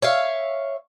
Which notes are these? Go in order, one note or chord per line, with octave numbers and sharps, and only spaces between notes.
C#5 E5 F5